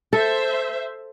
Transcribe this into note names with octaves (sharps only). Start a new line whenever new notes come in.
A4 C5 E5